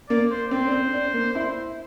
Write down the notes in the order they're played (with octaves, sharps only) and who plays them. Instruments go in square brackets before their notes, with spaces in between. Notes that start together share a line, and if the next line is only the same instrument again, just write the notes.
[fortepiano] A#3 [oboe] D5
[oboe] C5
[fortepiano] C4 [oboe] C5
[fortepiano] D4
C4
D4
A#3
E4